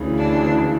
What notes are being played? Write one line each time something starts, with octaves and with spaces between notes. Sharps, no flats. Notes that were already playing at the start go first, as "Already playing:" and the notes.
Already playing: D2 C#3 E3
D4